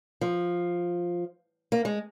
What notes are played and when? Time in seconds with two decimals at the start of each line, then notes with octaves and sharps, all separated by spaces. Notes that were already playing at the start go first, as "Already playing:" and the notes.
0.21 F3
1.72 A#3
1.85 G#3